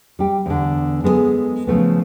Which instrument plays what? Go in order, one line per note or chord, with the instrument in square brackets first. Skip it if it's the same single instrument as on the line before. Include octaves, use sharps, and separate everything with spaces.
[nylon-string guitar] G3 G4
E2 D3
G#3 B3 E4 G#4 A4
C#3 F3 A3 B3